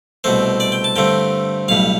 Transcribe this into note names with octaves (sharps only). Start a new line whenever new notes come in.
C2 B2 A3 C4 C5
D5
G5
A5
G2 D3 A3 C4 G5
B1 A2 G3 F5